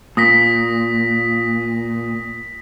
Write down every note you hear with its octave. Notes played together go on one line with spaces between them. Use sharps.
A#2 D#6 A#6 B6